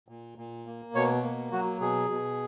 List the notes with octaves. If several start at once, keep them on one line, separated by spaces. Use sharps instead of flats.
A#2
A#2
A#3
B2 C#5
A#3
F#3 F#4
B2 G#4
B2